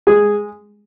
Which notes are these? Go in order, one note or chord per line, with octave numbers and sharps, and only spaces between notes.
G#3 G#4